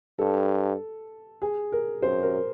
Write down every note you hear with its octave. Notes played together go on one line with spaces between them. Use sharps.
G2 A4
G#4
A#4
F#2 C5
A#4